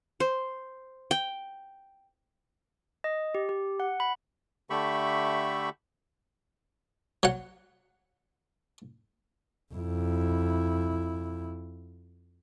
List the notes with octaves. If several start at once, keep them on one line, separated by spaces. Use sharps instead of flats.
C5
G5
D#5
G4
G4
F#5
B5
D3 A3 G4 E5 B5 C#6
F#3 F#5
F2 E4